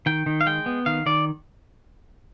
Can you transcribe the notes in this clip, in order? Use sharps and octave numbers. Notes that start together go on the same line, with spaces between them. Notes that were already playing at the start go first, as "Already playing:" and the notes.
D#3 G5
D#3
F5
G#3 G5
B3
D#3 F5
D#3 D5